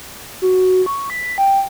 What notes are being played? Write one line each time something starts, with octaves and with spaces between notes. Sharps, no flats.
F#4
C#6
B6
G5